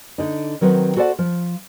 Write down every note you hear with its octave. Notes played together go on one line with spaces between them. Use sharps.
D3 D#4
D#3 F#3 C4 B4
F#4 A4 C5 D5 F#5
F3